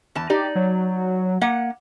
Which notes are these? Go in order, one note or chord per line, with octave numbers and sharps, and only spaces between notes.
E2 A5
D#4 G4 D5
F#3
A#3 F#5